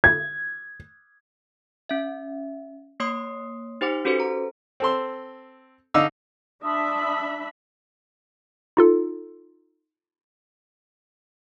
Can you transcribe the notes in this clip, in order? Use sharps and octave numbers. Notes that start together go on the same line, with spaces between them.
G#6
C#4 E5
A#3 C#5 C6 D#6 C7
D#4 G4 C5 F#5 D6
C#4 F#4 G4 A4 B4 C5
A#5
C4 A4 C6
D3 D#4 F5 D6 E6
D4 E5 A5 B5 C6 D#6
D#4 F4 A4